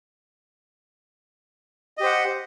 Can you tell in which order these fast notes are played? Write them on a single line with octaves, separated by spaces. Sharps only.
D#5 G4 C5 F#5